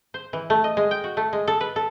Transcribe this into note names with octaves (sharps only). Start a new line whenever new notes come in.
C5
E3
A3
D#5
G#3
G5
F#4
A3
G#3
A4
B4
A4